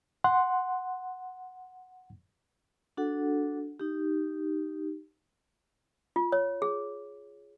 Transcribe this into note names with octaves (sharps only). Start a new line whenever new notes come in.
F#5 C6
D4 F#4 A4 F#5
D#4 G4
F4
C#5
G#4